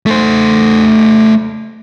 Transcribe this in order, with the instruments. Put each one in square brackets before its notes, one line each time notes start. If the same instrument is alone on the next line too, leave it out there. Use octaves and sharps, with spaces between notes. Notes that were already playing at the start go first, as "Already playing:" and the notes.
[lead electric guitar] A3 C5